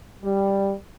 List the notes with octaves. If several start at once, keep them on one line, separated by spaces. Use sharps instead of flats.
G3